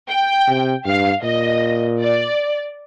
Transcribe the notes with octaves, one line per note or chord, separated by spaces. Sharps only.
G5
C3
G2 F5
A#2 D#5
D5